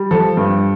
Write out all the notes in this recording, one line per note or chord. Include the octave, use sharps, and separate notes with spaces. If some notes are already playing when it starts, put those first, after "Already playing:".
Already playing: G3
F3 A4
G2